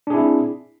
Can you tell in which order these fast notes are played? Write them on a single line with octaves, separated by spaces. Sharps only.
D4 G#4 E4 C4